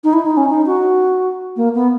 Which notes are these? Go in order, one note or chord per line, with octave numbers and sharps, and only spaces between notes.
D#4
E4
D#4
C#4
D#4
F#4
A#3
B3